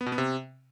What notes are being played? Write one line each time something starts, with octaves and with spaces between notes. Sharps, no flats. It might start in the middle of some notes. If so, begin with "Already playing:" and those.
B3
B2
B3
C3